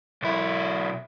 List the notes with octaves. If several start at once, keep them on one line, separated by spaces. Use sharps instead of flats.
B1 E4